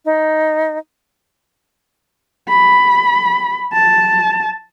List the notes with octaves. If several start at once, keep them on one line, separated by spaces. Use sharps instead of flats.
D#4
B5
A5